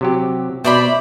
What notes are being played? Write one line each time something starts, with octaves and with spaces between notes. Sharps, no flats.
C3 F#3 G4
B2 C5 D5 E5 B5